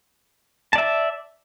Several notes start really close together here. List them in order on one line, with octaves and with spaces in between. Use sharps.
A5 D5 E5